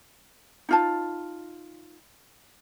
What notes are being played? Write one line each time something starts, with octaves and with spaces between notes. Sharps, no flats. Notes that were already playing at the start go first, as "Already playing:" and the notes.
D#4 F4 A5